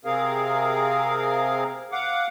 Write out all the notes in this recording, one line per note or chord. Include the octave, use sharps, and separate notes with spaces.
C3 C4 G#4 A#4 F5
F5 F#5 D6